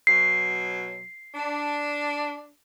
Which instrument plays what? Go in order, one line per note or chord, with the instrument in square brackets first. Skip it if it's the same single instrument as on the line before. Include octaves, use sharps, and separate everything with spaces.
[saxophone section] B2 F#3 [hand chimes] C7
[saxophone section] D4